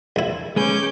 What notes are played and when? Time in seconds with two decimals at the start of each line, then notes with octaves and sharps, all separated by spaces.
0.16 A#1 E4
0.56 G#3 C#4 G#4 B4 D6 G6